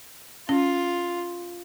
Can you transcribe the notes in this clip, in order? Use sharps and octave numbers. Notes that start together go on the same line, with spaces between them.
C#4 F4